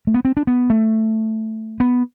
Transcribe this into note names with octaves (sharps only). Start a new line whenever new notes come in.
A3
B3
C4
D4
B3
A3
B3